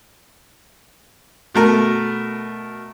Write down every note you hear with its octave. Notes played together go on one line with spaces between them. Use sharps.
B2 A3 A#4